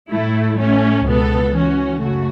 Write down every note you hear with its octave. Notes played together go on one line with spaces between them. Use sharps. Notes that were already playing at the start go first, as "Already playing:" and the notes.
A2 A3 E4
A2 A3 C#4
C#2 B2 B3 A4
E3 C#4 F#4
F#2 C#3 A3 F#4